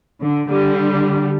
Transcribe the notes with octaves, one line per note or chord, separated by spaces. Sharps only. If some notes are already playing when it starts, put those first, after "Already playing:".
D3
D3 G3